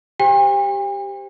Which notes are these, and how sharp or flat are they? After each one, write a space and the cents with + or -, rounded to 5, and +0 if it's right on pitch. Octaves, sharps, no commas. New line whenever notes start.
G4 +0 C5 +0 G5 +45